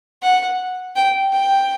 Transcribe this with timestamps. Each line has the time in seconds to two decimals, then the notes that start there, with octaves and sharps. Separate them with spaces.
0.22 F#5
0.96 G5
1.32 G5